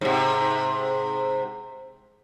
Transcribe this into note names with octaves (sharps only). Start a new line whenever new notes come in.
G#2 C3